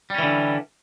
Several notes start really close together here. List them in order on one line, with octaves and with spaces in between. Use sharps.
G3 C#4 E3 D3